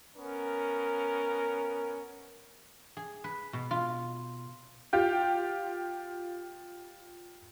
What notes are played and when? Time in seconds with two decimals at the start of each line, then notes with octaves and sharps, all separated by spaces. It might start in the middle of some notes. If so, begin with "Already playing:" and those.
0.17 B3 C#4 A#4
2.97 G#4
3.24 B4
3.53 B2
3.71 F4
4.93 F4 G4 G5